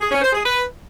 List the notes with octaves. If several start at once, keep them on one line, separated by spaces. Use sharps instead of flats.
G#4
C#4
C5
G#4
B4